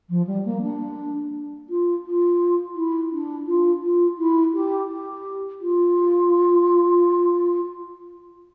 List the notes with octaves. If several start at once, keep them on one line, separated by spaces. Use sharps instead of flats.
F3
G3
A#3
D4
F4
F4
E4
D4
F4
F4
E4
G4
G4
F4